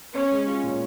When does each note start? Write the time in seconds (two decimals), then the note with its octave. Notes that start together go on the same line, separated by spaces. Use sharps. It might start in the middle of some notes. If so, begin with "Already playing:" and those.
0.15 C#4 C#5
0.31 G#3
0.47 F4
0.63 A#2